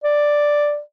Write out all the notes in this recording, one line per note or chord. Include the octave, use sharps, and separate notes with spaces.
D5